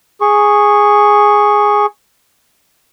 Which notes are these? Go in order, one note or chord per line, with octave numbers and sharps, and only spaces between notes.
G#4 C#6